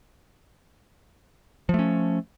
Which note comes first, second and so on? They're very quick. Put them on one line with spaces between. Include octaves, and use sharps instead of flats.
F3 A3 C#4